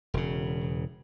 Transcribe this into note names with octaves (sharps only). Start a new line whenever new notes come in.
E1 C#3